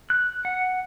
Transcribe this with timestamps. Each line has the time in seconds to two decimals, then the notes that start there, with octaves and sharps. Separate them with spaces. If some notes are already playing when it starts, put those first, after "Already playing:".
0.10 F#6
0.45 F#5